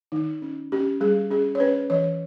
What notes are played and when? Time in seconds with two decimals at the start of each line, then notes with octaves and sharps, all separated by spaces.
0.12 D#3 D#4
0.42 C#4
0.72 C#4 G4
1.00 G3 G#4
1.30 C#4 G#4
1.55 C#5
1.60 C#4 B4
1.90 E3 C#5